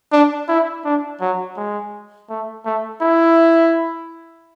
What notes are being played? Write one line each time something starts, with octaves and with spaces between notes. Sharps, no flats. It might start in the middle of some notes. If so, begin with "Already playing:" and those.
D4
E4
D4
F#3
G#3
A3
A3
E4